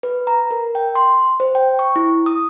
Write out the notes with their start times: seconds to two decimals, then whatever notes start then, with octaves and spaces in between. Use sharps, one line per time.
0.03 B4
0.27 A#5
0.51 A#4
0.75 G5
0.95 C6
1.40 C5
1.55 G5
1.79 C#6
1.96 E4
2.26 D#6